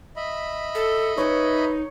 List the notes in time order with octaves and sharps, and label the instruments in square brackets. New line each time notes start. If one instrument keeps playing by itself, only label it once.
[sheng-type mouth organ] D#5 E5 B5
[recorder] A4
[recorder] D#4 [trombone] B4 [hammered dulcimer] C#5